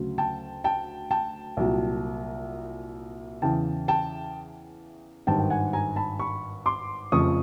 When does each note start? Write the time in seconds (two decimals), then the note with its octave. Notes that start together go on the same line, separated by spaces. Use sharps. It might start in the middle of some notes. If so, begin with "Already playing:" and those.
Already playing: D2 C#3 F#3
0.18 G5 A5
0.64 G5 A5
1.11 G5 A5
1.57 C2 A#2 F#3
3.42 E2 C#3 E3 G5 A5
3.88 G5 A5
5.27 G#1 G2 D#3 G5 A5
5.39 G5
5.50 F#5 G#5
5.73 G#5 A#5
5.96 A5 B5
6.19 B5 C#6
6.66 C6 D6
7.12 F1 F2 C#3 F3 C#6 D#6